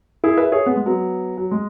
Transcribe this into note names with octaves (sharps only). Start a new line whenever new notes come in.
E4 G#4
B4 E5
G#4 C#5
B3
G#3
F#3 B3
F#3
G#3